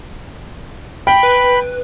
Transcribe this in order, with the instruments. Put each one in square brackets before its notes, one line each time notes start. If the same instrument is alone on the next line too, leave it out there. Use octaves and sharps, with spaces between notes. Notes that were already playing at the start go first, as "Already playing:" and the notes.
[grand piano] G5 [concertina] B5
[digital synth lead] B4